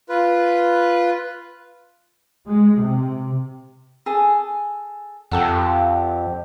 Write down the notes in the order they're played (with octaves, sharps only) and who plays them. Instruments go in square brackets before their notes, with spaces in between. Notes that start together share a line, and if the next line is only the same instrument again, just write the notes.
[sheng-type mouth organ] F4 B4
[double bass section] G#3
C3
[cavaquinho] G#4 A4 G#5
[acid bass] F2 [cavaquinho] G4 A4 F#5